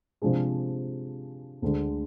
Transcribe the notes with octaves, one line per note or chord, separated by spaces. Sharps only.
C3 F3 G#3 D4 G#4
D2 D3 G#3